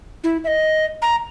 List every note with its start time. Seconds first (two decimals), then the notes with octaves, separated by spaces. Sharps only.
0.24 E4
0.44 E5
0.48 D#5
1.02 A#5